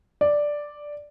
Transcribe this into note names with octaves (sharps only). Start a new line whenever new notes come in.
D5